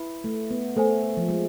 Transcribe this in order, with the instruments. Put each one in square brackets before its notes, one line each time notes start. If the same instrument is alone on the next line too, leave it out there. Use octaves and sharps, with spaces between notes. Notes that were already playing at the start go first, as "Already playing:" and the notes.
Already playing: [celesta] E4 B4 E5 B5
[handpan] A3
B3
[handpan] A3 [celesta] A4 C5 G#5
[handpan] F3
G#3